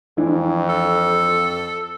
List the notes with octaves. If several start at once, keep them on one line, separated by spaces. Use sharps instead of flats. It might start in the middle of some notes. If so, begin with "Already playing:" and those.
F2 E3 D4
A4